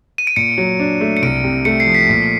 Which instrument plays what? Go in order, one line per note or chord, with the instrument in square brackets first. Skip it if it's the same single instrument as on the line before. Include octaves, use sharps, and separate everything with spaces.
[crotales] D#7
D7
[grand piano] A#2 [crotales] C#7
[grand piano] F#3
D4
A3
[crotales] C#7
[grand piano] C2 [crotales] D7
[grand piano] C3
[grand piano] A3 [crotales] C#7
[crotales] C7
[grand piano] F3
[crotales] B6
[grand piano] A#2